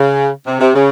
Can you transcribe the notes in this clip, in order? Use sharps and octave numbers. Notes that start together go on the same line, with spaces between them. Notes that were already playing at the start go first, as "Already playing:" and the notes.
Already playing: C#3
C3
C3
C#3